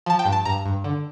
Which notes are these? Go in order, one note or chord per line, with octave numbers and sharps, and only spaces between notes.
F3 A5
G5
G2
A5
G2 A#5
G2
D3